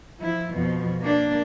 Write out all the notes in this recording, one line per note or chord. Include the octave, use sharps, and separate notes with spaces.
F3 E4
F2 B2 F3
A#3 D4